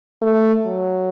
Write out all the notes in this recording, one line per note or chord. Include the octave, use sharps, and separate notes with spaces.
A3
F#3